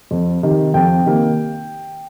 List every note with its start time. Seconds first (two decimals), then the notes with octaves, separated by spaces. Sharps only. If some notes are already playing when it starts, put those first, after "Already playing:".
0.11 F2
0.43 C3 D#3
0.74 F2 G5
1.05 C3 D#3 A#3